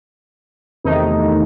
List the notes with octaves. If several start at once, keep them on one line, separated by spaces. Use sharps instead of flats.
E2 C3 D#3 A3 D#4